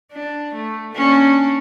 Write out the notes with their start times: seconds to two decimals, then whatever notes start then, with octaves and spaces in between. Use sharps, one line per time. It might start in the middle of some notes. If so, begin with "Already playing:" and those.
0.12 D4
0.55 A3
0.95 A#3 C#4 D4